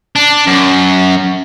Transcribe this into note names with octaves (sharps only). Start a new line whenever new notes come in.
D4
F#2